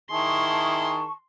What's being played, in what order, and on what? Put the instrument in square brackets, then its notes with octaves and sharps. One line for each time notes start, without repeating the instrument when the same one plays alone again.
[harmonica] D#3 E4 G#4 [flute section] A5 C#6 [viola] C6